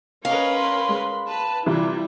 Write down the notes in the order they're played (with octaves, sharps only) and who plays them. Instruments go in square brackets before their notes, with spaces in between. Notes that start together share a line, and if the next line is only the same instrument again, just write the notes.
[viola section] C#4 A#4 B4 [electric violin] C#5 D#5 [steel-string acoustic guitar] F5
[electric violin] B5 C6
[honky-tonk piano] G#3
[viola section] B4 [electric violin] A5
[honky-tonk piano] C3 E3 F4 [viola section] G3 [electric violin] E4